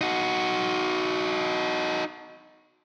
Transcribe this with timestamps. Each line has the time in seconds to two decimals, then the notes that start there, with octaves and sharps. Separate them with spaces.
0.01 D#4 F#4